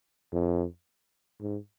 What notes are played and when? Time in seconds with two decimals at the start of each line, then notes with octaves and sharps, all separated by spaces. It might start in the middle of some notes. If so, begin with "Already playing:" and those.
0.33 F2
1.41 G#2